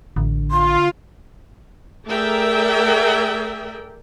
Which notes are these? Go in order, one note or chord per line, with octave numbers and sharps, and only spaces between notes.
A1 D3
F4 C6
A3 G#4 A#4 D5 E5 G5